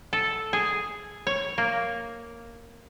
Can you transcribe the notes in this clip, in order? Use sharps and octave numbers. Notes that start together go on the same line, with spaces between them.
A4
G#4
C#5
A#3